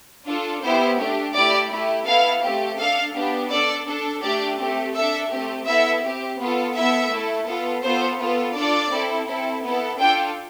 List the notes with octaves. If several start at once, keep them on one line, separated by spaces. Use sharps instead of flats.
D4 F4 A4
B3 E4 G4 C5
A3 D4 G4
A3 E4 G4 D5
A3 E4 G4
B3 E4 A4 F5
A3 C4 G4
D4 A4 F5
B3 D4 G4
D4 A4 D5
D4 A4
A3 D4 G4 D5
A3 C4 G4
D4 A4 E5
A3 C4 G4
B3 E4 A4 E5
C4 G4
B3 F4 A4
B3 E4 A4 E5
A3 E4 A4
B3 F4 A4
B3 F4 A4 C5
B3 F4 A4
D4 F4 A4 D5
C4 E4 A4
C4 E4 A4
B3 E4 A4
D4 F4 A4 G5